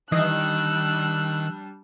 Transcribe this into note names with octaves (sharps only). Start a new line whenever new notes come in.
D#3 E3 G3 D4 D#5 E6 F#6 C7